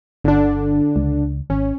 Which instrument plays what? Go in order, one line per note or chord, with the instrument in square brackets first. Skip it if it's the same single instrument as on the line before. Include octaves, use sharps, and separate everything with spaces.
[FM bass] G1 [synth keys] D3 D4
[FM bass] C#2
[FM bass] G#1 [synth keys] C#4